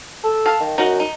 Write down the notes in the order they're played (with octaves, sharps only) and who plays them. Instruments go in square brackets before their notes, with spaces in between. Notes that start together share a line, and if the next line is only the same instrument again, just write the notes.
[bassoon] A4
[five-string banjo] F5 A5
[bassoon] D#3
[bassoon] F#2 [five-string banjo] D#4 F#4 F#5
[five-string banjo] D#4